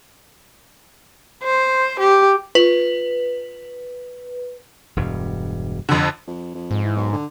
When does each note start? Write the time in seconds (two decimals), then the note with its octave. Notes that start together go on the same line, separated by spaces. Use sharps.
1.43 C5
1.99 G4
2.55 F4 B4
4.97 E1 G2
5.89 F2 D3
6.27 F2
6.55 F2
6.71 G#2
6.84 E3
6.97 B1
7.12 D3